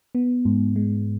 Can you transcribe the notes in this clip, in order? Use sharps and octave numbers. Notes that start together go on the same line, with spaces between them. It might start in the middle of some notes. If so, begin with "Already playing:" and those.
B3
G#2
G#3